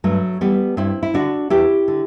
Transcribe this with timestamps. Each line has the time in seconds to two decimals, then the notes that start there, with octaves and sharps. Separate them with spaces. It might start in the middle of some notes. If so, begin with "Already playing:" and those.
0.04 G2 F#3 A3
0.41 E3 G3 B3
0.77 G2 C4 E4
1.03 E4
1.14 D3 D4 F#4
1.50 E2 E4 G4
1.88 D3